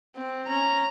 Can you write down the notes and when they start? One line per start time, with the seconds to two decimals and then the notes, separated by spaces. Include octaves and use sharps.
0.16 C4
0.48 C#4 A#5